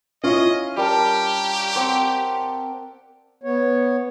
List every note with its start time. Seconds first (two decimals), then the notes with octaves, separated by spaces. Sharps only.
0.24 C#4 E4 F4 D#5 F5
0.77 G3 G4 A#4 A5
1.76 C4 D5 F#5
3.43 B3 C#5